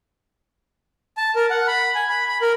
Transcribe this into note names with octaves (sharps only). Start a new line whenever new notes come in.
A5
A#4
F#5
B5
G#5
B5
B5
A#4